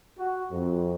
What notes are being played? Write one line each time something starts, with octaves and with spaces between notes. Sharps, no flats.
F#4
F2